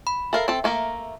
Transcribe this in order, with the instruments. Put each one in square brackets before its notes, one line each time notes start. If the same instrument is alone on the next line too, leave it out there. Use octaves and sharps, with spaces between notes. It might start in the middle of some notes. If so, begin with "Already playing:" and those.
[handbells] B5
[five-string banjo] A4 A#4 F5 [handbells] E5
[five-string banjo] C4 A4
A3 A#3 A#4